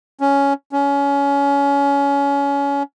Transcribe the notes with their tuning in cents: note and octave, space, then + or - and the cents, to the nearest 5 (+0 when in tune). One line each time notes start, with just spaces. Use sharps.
C#4 +10
C#4 +25